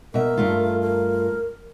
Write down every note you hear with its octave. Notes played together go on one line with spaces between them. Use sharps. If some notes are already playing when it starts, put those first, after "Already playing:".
B2 A#4 E5
G2 A3 F4
A#4